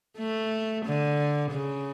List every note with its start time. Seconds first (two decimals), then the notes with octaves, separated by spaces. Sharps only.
0.18 A3
0.86 D3
1.51 C#3